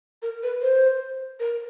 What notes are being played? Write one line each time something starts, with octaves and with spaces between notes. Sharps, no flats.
A#4
B4
C5
A#4